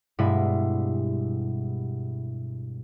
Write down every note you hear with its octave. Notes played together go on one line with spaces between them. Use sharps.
G2 B2 G3 G#3 E4